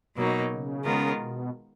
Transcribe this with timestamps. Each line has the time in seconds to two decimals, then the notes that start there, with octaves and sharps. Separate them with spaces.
0.15 B2 F#3 A#3 D#4
0.50 C#3
0.84 D#3 G#3 B3 F4 A#4
1.19 B2